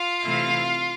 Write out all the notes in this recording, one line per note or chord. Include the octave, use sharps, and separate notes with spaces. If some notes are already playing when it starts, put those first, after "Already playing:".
Already playing: F4 F5
C3 E3 A3 C4 E4